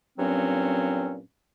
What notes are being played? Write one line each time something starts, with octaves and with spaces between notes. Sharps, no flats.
G2 A#2 F#3 C4 C#4